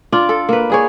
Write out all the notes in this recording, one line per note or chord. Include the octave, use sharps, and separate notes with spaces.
D4 F4 D5
A4
A#3 B4
D4 G#4 C#5